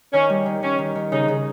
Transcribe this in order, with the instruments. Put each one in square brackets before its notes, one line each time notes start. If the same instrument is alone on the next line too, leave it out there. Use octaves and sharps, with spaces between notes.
[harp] D#3 [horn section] C#4
[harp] G3
D#3
[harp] D#3 [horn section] C#4
[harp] D#3
D#3
[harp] C#3 [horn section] D#4
[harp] C#3